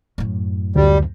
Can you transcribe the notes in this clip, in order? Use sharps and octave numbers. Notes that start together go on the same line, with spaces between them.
F#2 A2
D2 G3